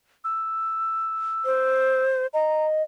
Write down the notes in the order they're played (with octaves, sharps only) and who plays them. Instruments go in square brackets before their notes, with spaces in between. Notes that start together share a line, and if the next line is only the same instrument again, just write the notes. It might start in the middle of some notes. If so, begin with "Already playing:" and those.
[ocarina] E6
[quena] C5
[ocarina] D#5 [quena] A#5